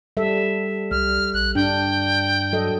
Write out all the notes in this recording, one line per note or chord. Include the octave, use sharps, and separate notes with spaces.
G3 A4 E5
C2 G3 F6
A#1 F#6
G2 D4 G5
F#3 A4 D#5